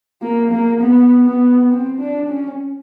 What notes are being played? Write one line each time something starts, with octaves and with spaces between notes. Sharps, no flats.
A#3
A#3
B3
B3
C4
D4
C#4